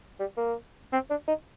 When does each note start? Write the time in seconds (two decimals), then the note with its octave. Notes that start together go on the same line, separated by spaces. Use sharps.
0.20 G3
0.37 A#3
0.93 C4
1.10 D4
1.28 D#4